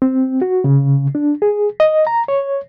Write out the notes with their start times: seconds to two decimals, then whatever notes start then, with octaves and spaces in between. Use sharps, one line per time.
0.02 C4
0.42 F#4
0.64 C#3
1.15 D4
1.42 G#4
1.80 D#5
2.07 A#5
2.28 C#5